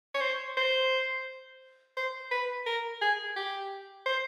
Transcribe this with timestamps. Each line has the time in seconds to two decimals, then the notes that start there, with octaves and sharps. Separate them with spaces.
0.14 C#5
0.21 C5
0.57 C5
1.97 C5
2.31 B4
2.66 A#4
3.01 G#4
3.36 G4
4.06 C5